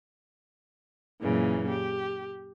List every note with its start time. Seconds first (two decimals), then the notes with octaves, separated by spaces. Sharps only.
1.20 F#2 A#2 C#3 E3
1.68 G4